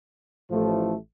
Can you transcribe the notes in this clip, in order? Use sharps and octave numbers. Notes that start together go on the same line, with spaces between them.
A1 A2 F3 A3